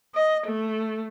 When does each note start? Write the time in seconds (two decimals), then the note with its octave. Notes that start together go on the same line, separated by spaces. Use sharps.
0.15 D#5
0.47 A3